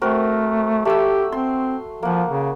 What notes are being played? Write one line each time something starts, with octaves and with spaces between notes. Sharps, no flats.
A3 C4 F#4 A#4
A3 G4 B5 E6
C4 C6
F3 A#3 F#5
C#3